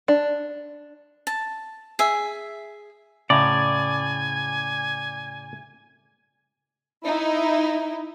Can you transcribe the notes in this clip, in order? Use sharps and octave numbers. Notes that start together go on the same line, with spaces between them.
D4
A5
G#4 E5
A2 C#3 D5 G#5 A#5
D#4 E4